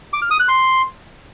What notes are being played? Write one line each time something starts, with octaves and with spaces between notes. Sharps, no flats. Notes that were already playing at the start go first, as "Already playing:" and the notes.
D6
F6
D#6
F#6
C6